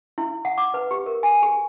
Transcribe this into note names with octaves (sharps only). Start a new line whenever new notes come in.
E4
F#5
D6
B4
G4
A#4
G#5
G#4